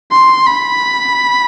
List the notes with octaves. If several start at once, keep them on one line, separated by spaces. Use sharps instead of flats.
C6
B5